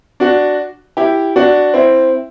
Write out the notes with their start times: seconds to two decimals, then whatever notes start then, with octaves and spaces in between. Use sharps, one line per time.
0.20 D4 F#4
0.97 E4 G4
1.36 D4 F#4
1.74 C4 E4